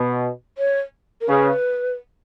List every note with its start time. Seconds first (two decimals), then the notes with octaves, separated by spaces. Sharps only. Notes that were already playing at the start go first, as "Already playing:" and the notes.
Already playing: B2
0.58 C#5
1.21 A#4
1.29 C#3 B4